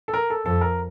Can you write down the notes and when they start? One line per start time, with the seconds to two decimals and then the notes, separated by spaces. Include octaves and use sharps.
0.08 A4
0.14 A#4
0.30 A4
0.46 F2 A4
0.61 A#4